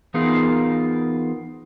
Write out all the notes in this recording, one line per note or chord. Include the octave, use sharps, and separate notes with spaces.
E3 B3 D#4 F4 G#4 A#4